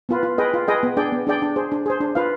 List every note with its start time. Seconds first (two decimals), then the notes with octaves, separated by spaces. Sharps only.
0.09 B3 F4 B4
0.23 F4
0.38 G#4 B4 D#5 G5
0.54 F4
0.68 G#4 B4 D#5 G5
0.83 B3
0.97 D4 G#4 D5 G5
1.12 B3
1.27 D4 G#4 D5 G5
1.42 D4
1.56 G#4 C5
1.72 D4
1.86 G#4 C5
2.01 D4
2.15 F4 B4 F5